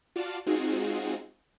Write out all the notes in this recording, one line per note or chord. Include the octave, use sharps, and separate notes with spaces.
F4 F#4 D5 F5 A5
G#3 C4 D#4 F4 F#4 G#4